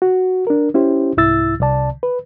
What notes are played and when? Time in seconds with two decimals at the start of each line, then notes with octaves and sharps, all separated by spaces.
0.02 F#4
0.47 D4 A#4
0.74 C#4 E4 G4 C5
1.17 C2 G#2 E4 E6 A6
1.60 C2 C3 D5 A5
2.03 B4